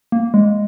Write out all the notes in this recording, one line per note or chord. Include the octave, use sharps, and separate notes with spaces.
A#3
G#3